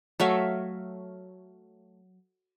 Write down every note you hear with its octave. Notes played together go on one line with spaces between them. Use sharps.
F#3 A3 E5 F5